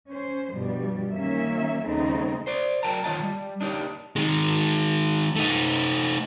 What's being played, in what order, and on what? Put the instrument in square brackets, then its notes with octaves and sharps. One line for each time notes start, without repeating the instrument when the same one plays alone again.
[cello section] C#4 C5
G2 B2 F3 G3
D#3 F#3 A#3 C#4 E5
D#2 C#3 G3 A3 C4 D#4
[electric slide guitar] C5 D5
F#3 A#4 G5 A5 A#5
D#3 F4 C#5 D#5 A5
G3
D4 D#4 G4 C#5
[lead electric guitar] D#3 G#3
A3 D#4